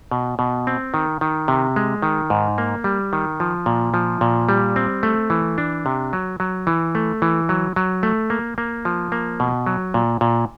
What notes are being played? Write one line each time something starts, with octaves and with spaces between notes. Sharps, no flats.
B2
B2
C4
D#3
D#3
C3
G#3
D#3
G#2
A#3
G3
D#3
F3
A#2
F3
A#2
G3
C4
A3
E3
D4
C3
F#3
F#3
E3
A3
E3
F#3
F#3
A3
A#3
A#3
F3
A#3
B2
F#3
A#2
A#2